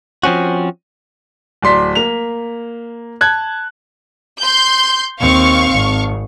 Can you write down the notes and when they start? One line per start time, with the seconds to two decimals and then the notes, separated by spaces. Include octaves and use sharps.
0.23 F3 C4 C#4 F#4
1.63 D1 D5 C6 B6
1.95 A#3 F7
3.21 A5 F#6 G#6
4.41 C6 G6
5.20 D#2 C4 F5 C#6
5.72 G#1